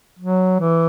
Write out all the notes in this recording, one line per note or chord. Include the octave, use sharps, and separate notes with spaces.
F#3
E3